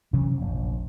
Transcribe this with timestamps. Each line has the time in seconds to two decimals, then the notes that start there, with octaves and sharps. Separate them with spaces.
0.13 C3 E3 F#3 C#4
0.37 F1 A#1